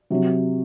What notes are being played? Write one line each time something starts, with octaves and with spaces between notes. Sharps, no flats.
C3 F#3